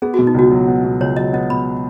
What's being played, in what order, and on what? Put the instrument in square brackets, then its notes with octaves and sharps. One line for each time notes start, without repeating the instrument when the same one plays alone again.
[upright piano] B3 [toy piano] G#4
[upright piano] B2 [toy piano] F#4
[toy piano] D#4
[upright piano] C#2 [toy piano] F#4
[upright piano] F#3
B3
B2
[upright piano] C#2 [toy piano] C#5
[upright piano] F#3 [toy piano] D#5
[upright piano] B3 [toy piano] D#5
[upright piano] B2 [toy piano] B5